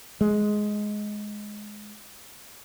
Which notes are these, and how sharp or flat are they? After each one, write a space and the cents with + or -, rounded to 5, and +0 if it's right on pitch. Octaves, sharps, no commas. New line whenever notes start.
G#3 +10